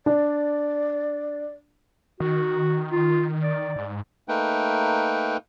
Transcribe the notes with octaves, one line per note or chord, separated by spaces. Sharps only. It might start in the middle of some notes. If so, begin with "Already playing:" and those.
D4 D5
D#3 F#4
F4
D5
G#2
A3 A#3 D#4 A#4 B4 G5